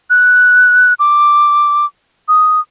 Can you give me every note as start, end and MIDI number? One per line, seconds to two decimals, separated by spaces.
0.10 0.94 90
1.00 1.86 86
2.28 2.60 87